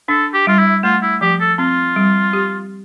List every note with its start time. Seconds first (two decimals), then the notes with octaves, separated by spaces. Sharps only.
0.08 D4 A4
0.34 G4
0.47 G3 F4
0.59 E4
0.83 A3 F4
1.02 E4
1.21 F3 G4
1.40 A4
1.58 C4 F4
1.96 G3
2.33 G4